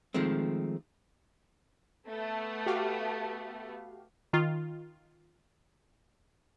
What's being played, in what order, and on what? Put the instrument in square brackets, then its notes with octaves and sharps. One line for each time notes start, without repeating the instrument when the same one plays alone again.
[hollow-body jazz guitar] D#3 F3 G#3 A3 C4
[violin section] A3 B3
[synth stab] F#4 G4 F5
D#3 F4